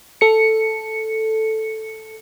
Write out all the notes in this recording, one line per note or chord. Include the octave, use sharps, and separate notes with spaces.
A4 C#7